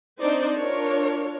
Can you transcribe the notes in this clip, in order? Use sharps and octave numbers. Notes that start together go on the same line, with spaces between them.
C4 D4 D#4 C5 D5
D4 F4 A#4 C#5